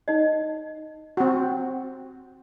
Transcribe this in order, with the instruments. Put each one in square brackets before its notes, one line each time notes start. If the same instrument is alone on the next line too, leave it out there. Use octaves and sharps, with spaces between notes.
[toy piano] D#4 D#5
[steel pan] C4 F#4